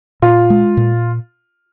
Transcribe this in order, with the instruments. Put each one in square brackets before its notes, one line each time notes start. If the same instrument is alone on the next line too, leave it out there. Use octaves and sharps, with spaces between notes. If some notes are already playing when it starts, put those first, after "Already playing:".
[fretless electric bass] A#2 [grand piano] F4
[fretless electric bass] G#3
A#2